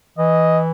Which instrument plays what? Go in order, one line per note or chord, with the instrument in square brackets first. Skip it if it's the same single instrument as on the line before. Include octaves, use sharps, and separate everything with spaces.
[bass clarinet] E3 [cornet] D#5